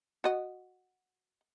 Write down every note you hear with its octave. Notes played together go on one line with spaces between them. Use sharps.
F#4 D#5